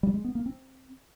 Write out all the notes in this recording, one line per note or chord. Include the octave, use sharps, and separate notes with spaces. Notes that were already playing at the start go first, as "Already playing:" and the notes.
G3
G#3
B3
A#3
C4